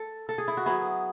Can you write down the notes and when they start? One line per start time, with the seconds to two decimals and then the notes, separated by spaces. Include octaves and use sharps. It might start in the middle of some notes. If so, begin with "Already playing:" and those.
Already playing: A4
0.29 A4
0.38 G#4
0.48 E4
0.57 F#4
0.66 F#3 B3 E4 G#4